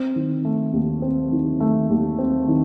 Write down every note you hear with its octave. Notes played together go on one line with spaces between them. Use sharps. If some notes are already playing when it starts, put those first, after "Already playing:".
Already playing: C4
D#3
A3
D#2
C4
D#3
A3
D#2
C4
D#3